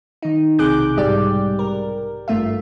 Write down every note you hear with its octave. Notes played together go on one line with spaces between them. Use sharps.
D#3 D#4
B1 C3 G#4 D6 F#6 G6
B1 G#2 G3 G4 D5
A#4
G#1 G2 A3 F4 E5